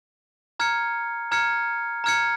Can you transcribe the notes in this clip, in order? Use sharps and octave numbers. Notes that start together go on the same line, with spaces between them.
A#5 F6 G#6 C#7
A#5 F6 G#6 C#7
A#5 F6 G#6 C#7